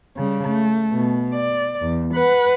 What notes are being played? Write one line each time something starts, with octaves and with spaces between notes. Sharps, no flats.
C#3 G3
A3
B2
D5
E2
B4 F#5